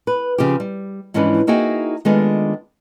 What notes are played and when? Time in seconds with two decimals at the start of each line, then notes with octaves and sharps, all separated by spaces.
0.07 B4
0.38 C#3 F3 F4 G4
0.60 G3
1.14 G#2 E3 F3 C#4 D4 B4
1.47 A#3 D#4 E4 F#4 G#4 G5
2.05 D#3 G#3 A3 B3 D4 F4